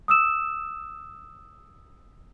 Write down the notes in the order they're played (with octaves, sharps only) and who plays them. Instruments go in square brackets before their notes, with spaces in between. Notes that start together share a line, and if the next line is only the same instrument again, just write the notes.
[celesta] D#6 E6 E7